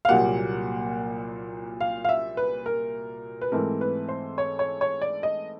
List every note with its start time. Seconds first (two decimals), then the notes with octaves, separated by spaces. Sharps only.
0.05 F5
0.09 C2 A#2 F#3 A#3 F#5
1.81 F5
2.05 F5
2.09 E5
2.37 B4
2.66 A#4
3.41 B4
3.52 G#2 E3 A3 C4 A#4
3.81 B4
4.09 C5
4.38 C#5
4.59 C#5
4.81 C#5
5.02 D5
5.23 D#5